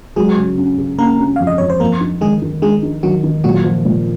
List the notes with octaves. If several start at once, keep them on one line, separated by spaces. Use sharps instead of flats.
F#3 G#3 G#4
C#3
C#4
C#3
A#3 C#4 A#4
C#4
F2 F5
D#5
F2 C#5
C5
F2 A#3 A#4
D#4
D#3 G#3 G#4
D#3
G#3 D#4 G#4
D#4
D#3 F#3 F#4
D#3
A#2 F#3 F#4
F3
A#2